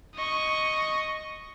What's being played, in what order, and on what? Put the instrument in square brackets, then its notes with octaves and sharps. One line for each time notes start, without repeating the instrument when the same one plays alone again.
[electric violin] D#5 C#6